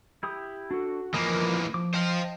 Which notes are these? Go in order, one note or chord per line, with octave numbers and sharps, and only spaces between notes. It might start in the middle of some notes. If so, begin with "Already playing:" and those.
E4 G4 D#6
D4 F#4 A4
E3 F3 A#3 A#4 D#5
F3 D6
C5 D#5 F5 G5 A5